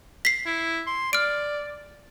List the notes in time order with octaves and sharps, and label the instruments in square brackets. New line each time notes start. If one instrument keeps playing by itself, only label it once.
[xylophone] B6 C7
[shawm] E4
C6
[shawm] D5 [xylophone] F6 D7